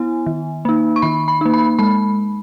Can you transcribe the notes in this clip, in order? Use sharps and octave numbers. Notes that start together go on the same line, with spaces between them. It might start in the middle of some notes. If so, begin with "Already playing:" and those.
Already playing: B3 E4 G#5
D#3
A#3 D#4
C#6
D#3 B5
B5
A#3 D#4
B5
G#3 B5